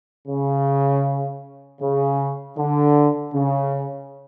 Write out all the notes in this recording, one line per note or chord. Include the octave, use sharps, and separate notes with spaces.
C#3
C#3
D3
C#3